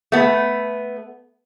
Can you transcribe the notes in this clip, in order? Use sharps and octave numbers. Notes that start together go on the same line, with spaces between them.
A3 B3